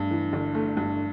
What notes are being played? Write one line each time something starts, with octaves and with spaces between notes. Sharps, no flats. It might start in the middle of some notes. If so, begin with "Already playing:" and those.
Already playing: G2 A3
E3
G1
A3
G2